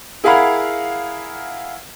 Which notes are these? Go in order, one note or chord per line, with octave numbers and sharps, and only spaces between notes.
E4 G#4 A#4 F5 F#5 B5